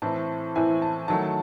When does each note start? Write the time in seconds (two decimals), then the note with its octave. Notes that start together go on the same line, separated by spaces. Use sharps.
0.02 A2 E3 C4 E4 A5
0.56 A2 E3 C4 E4 G#5
0.82 A5
1.08 D#3 F#3 A3 A5